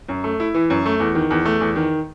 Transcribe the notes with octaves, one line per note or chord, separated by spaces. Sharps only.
F#2
A3
E4
E3
F#2
A3
E2
D#3
E2
A3
E2
D#3